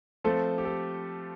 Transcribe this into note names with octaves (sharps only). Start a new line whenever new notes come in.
F3 A3 C4 A4
G4
A4